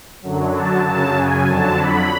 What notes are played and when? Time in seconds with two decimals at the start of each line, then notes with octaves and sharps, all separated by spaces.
0.22 F#2 D3 F#3
0.53 A5
0.84 F#2 C#3 F#3 A5
1.16 G#5
1.47 F2 D3 F#3 A5
1.78 B5